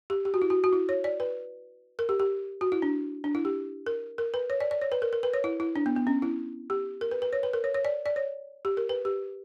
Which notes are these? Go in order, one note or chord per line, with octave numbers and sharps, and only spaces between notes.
G4
G4
F#4
E4
F#4
F#4
E4
C#5
D5
B4
A#4
G4
G4
F#4
E4
D4
D4
E4
G4
A#4
A#4
B4
C#5
D5
D5
C#5
B4
A#4
A#4
B4
C#5
E4
E4
D4
B3
B3
C#4
E4
G4
A#4
B4
B4
C#5
B4
A#4
C#5
C#5
D5
D5
C#5
G4
A#4
B4
G4